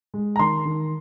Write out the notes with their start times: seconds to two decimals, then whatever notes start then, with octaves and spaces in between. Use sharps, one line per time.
0.14 G#3
0.36 A#5
0.39 D#3 C6
0.65 D#3